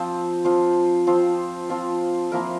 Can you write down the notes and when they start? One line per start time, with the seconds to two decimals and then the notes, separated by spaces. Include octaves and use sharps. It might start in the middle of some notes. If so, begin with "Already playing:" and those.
Already playing: F3 C4 F4 C5
0.44 F3 C4 F4 C5
1.07 F3 C4 F4 C5
1.69 F3 C4 F4 C5
2.31 F3 A#3 E4 A#4